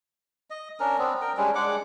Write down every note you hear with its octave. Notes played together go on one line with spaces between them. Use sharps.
D#5
C#4 D4 A#4
B3 C4 D4
A#4 G5
G3 G#3 C#4 D4
G#3 D4 F#5 D6